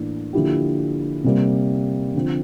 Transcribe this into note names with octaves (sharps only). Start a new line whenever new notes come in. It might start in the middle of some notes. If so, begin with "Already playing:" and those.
Already playing: A2 E3 A#3 D4
D3 F3 A#3 E4 G4
C3 G3 A#3
D3 F3 C4